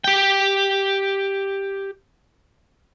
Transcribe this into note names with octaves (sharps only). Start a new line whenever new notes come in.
G4 G5